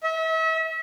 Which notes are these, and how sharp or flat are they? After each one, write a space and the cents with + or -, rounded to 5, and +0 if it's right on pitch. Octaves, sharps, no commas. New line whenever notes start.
E5 -35